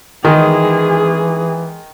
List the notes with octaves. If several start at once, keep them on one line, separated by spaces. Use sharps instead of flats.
D#3 E3 G#3 G#4